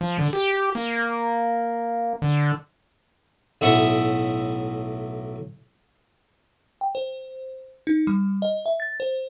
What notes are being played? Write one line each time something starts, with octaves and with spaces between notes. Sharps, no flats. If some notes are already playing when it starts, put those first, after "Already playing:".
F3
D3
G4
A#3
D3
B1 A2 E5 F#5 D#6
G5
C5
D#4
G3
D#5
E5
A6
C5